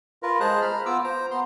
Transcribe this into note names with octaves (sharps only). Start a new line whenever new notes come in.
F4 A#4 B4
G#3 G#4 C5 A5 A#5 F#6
B5 F6
B3 F4 D6 E6
C5 A#5
B3 C6